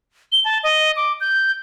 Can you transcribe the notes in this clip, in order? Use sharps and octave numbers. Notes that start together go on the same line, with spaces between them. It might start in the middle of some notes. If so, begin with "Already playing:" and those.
G7
A5
D#5
D6
G6